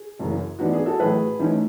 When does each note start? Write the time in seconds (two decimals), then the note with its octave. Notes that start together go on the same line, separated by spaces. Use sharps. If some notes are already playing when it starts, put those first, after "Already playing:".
Already playing: G#4
0.19 F#1 F#2 E3
0.59 G#2 E3 B3 D4 F#4
0.73 G#4
0.86 F#4 A4
0.99 A1 A2 F#3 G#4 B4
1.40 A1 G#2 E3 A3 C#4